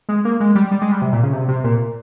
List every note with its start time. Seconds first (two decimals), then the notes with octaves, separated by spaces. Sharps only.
0.09 G#3
0.25 A#3
0.40 G#3
0.55 G3
0.71 G3
0.82 G#3
0.92 G3
1.02 C3
1.13 A#2
1.23 C#3
1.33 C3
1.48 C3
1.64 A#2